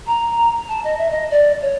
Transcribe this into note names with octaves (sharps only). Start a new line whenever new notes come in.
A#5
A5
D#5
E5
D#5
D5
C#5